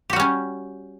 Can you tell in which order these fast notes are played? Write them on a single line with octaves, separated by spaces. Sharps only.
G4 F#4 G3 C#4